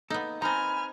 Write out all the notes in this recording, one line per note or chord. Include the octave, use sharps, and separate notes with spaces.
A#3 B3 D#4 A4
C4 D#4 G#5 A#5 B5 F6